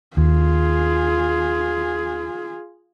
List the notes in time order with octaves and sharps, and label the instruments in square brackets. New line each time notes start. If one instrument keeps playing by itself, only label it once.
[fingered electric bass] D#2 [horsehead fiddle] F4 G#4